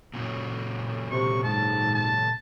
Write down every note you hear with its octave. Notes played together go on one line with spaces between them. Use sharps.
A#2 C#3 F#3
C3 C#6
G#2 A5
A5